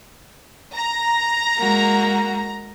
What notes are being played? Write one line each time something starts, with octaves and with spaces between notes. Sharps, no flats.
A#5
G#3 A#3 F#4